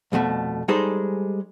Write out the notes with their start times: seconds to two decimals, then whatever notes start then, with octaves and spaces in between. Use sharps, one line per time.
0.12 C2 F2 B2 A3
0.68 G3 G#3 D#4 G#4 A4 C5